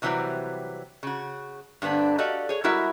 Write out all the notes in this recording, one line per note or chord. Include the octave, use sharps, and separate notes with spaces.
A2 C3 E3 F#3 G3 C4
C#3 F#4
G2 D3 B3 C4 D4
F#4 G4 A4 D5 D#5 F5
G#4 C#5
G3 G#3 E4 F#4 A#4 E5